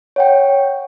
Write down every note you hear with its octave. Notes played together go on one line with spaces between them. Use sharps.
C#5 F#5 G5